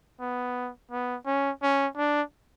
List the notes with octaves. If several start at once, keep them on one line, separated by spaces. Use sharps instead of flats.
B3
B3
C#4
C#4
D4